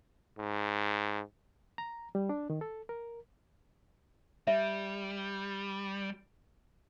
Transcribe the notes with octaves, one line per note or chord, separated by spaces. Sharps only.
G#2
A#5
G3
D4
D#3
A4
A#4
G3 E5